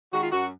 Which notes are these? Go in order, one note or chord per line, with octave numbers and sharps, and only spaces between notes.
D#3 G#3 F#4
F4
F#2 F#4